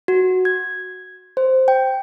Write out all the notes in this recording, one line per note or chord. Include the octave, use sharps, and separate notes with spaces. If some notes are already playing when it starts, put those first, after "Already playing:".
F#4
G#6
C5
G5